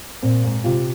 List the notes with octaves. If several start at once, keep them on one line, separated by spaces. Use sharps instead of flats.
A#2 C4
G#2
C3 F4